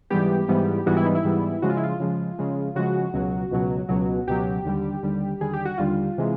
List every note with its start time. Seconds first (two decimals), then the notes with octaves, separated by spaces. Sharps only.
0.10 G#2 E3 G3 B3 G4
0.48 G#2 E3 G3 B3
0.86 G#2 E3 G3 B3 F#4
0.97 E4
1.06 D#4
1.15 E4
1.24 G#2 E3 G3 B3
1.62 C#3 F3 G#3 F#4
1.69 F4
1.77 E4
1.83 F4
2.00 C#3 F3 G#3
2.39 C#3 F3 G#3
2.75 C#3 F3 G#3 F#4
3.14 C#2 B2 F#3
3.51 C#2 B2 F#3
3.89 C#2 B2 F#3
4.27 C#2 B2 F#3 G4
4.65 D#2 D3 G3
5.03 D#2 D3 G3
5.41 D#2 D3 G3 G#4
5.53 G4
5.65 F#4
5.78 D#2 D3 G3 F4
6.18 C3 E3 G#3